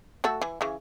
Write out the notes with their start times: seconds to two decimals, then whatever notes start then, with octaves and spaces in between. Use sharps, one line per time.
0.24 A3 F#4 A4
0.41 E3
0.61 C#3 E3